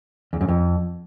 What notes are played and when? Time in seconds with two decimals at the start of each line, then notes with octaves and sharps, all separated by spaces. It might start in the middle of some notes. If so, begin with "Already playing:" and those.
0.33 E2
0.41 F#2
0.48 F2